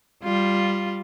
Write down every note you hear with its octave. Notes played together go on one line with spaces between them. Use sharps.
G3 F4